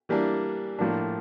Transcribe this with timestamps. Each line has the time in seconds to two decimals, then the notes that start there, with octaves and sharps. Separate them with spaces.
0.09 E3 G3 A#3 D4
0.79 A2 F3 A#3 D4